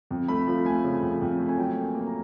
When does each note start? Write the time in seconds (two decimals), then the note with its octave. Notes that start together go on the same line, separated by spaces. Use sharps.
0.11 F2
0.28 A3 B5
0.47 F3
0.65 A3 G#5
0.84 C#3
1.02 F2
1.21 F2
1.39 A3
1.49 G#5
1.57 F#3 G5
1.76 A#3
1.83 G#5
1.94 A#3
2.07 A#5